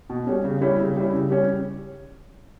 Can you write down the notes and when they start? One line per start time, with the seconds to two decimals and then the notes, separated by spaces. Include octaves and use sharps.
0.10 B2
0.27 G3 C#4
0.44 C#3
0.61 G3 C#4 E4
0.79 C#3
0.96 G3 C#4 E4
1.13 C#3
1.30 G3 C#4